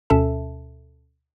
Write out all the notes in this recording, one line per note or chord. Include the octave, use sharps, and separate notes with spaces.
D2 B2 C#4 A4 E5 A5